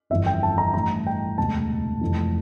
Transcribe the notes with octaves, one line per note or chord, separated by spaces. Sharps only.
G1 F2 E3 E5
G5
A5
A#5
A1 G2 E3 A#5
G5
E1 D2 C3 A5
F1 F2 E3